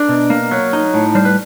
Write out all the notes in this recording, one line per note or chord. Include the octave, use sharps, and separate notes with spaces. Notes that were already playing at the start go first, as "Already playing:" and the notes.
Already playing: D4 A#4
B2
A#3
F#3
D#4
A2
G3 C5
B4